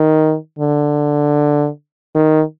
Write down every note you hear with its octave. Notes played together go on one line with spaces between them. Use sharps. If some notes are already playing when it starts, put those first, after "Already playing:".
Already playing: D#3
D3
D#3